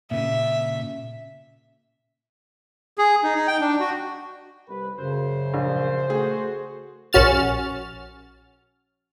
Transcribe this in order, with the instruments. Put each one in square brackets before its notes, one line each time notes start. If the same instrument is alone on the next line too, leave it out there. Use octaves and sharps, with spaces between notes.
[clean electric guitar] A#2 C#3 [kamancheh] E5
[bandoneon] G#4
D#4
D#4
G5
D4
F#4
[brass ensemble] C2 B4
[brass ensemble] F#2 [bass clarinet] C#3 [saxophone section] C5
[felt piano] A#1
[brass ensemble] A3 F#4 [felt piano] G#4
[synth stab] A#1 C#4 F#4 F6 A6